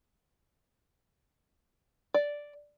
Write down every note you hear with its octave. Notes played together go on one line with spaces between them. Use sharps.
D5